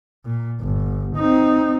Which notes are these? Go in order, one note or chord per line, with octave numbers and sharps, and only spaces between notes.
A#2
G1
C4 D#4